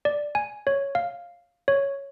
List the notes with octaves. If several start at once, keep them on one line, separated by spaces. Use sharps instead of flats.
D5
G#5
C#5
F5
C#5